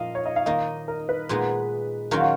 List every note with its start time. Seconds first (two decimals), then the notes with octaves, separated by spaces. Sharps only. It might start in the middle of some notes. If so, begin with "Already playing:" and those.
Already playing: A#2 F3 D#4 D#5 F5
0.15 C#5
0.26 D#5
0.36 F5
0.46 D#3 A#3 D#4 D#5
0.88 A#4
1.09 B4
1.29 A#2 G#3 B3 D#4
2.11 D#3 F#3 C#4 F4 A#4
2.21 F#4